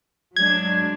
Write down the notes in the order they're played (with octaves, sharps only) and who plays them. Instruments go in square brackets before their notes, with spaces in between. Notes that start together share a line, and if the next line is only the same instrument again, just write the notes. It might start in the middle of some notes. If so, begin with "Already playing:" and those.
[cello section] F#3 G#3 D4 [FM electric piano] G#6